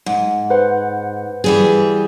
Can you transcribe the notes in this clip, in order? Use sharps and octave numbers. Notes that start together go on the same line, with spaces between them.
G#2
B4 C5 F#5
E3 G3 G#4